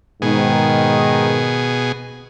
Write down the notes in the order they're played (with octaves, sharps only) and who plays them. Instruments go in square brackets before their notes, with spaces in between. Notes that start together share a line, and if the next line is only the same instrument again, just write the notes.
[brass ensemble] G#2 D#3 [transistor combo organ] B2 G#4